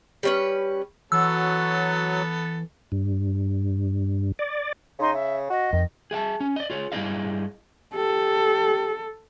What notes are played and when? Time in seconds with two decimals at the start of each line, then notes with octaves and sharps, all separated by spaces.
0.23 G3 C#4 B4
1.12 E3 F#3 B3 A4 E6
2.92 G2
4.39 D5
4.99 C#3 D#4 D#5 C6
5.11 E5
5.50 F#4 D#5
5.73 F2 D#3
6.11 G#4 E5 G5 A5
6.40 C#4
6.56 D5 D#5
6.70 F4 G#4 C#5
6.92 G2 B3 E4 G#4 D#5 F5
7.95 G4 A4